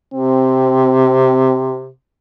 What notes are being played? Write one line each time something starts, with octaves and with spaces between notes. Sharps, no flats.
C3 C4